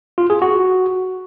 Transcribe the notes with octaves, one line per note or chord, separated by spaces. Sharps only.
F4
G#4
F#4